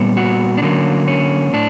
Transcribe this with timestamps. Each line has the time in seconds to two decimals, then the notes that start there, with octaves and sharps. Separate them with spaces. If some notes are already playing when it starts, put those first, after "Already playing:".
Already playing: A#2 G3 B3
0.17 F#4
0.57 D4
0.62 D3 F#3 A#3 C#4
1.08 C#4
1.53 A2 D4